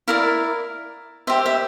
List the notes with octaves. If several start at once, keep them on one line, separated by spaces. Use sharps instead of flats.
E4 A#4 D5 F5
G4 C5 E5
E5